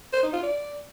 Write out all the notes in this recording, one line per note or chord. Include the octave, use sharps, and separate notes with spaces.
C5
D#4
F4
D5